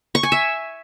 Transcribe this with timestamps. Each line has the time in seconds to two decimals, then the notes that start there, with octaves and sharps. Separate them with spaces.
0.15 C#6
0.23 G#5
0.32 E5